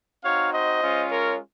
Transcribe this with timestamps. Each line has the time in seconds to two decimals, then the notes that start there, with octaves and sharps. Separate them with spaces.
0.24 C4 D#4 F#4 C#5 F5
0.53 C5 D#5
0.82 G#3 C#4 F4
1.10 A#4 C#5